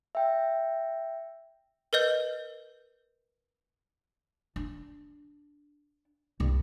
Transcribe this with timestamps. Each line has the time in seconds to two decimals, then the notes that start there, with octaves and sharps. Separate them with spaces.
0.15 E5 G5
1.93 A#4 B4 D#5 G6
4.56 D4
6.40 C2 G2